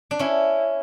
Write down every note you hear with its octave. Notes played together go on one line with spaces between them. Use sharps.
D4
C#4 E4